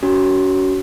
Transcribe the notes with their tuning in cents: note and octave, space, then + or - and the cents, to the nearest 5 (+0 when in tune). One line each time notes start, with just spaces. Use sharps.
C#4 +40 F#4 +25 C#5 +0